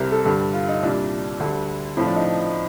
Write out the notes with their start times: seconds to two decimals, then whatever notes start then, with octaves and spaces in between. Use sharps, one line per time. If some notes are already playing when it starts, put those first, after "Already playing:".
Already playing: C2 C3 G3 A#4
0.11 A4
0.25 G2 D3 G3
0.53 F4
0.68 D#4
0.83 C2 A#2 G3 D4
1.39 D2 D3 G3
1.97 A2 F3 C4
2.06 D4
2.16 D#4